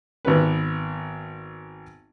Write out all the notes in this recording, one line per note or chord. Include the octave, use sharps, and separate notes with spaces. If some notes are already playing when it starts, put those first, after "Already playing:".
G#1 B3 B4